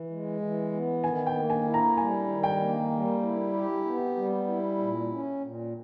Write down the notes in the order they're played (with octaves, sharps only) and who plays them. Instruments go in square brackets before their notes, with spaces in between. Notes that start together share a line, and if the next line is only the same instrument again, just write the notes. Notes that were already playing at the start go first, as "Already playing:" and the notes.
Already playing: [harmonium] E3
G#3
E3
B3
[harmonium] D#3 [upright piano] G#5
[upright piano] G5
[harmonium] A#3
[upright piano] G#5
[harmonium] E4
[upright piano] A#5
[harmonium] G3 [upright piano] G#5
[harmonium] D#3
[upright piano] G5
[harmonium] A#3
G3
E4
G4
B3
G3
E4
A#2
C#4
A#2